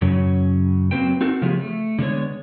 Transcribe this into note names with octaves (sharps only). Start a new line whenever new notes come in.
F#2 C#3 F#3 C#4
F#3 A#3 C4 B4 C5 G5
C4 D#4 F#4 A4 A#4
C#3 F3 A3 B3 G4 G#4
A3
D3 G#3 B3 C#5